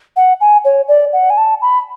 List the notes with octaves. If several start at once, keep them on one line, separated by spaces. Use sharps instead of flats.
F#5
G#5
C#5
D5
F#5
G#5
A5
B5